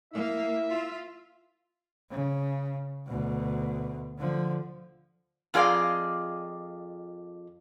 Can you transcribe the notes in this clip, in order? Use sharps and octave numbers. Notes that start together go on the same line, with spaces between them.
A#3 E4 E5
F4
C#3
D2 B2
D3 F3
F2 F4 G#4 D5 D#5 F5